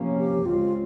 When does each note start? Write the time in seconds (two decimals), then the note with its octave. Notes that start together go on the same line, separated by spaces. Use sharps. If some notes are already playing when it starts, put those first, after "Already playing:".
Already playing: C3 F3 A#3 C#4
0.18 G4
0.45 C#2 C#3 G#3 C4 F4